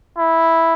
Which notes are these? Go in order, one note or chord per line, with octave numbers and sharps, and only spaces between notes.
E4